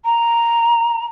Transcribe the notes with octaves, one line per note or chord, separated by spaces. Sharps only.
A#5